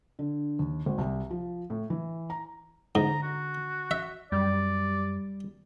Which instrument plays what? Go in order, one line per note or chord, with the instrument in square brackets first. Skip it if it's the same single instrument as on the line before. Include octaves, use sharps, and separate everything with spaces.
[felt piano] D3
D#2
G#1
C2
F3
A2
E3
A#5
[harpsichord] G#2 [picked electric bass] D3 [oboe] A#5
[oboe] F#4
[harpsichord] E5
[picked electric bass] F#2 [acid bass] G3 [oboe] D5